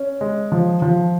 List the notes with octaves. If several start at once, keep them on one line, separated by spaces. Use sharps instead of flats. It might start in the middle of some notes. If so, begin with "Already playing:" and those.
Already playing: C#4
G#3
F3
F3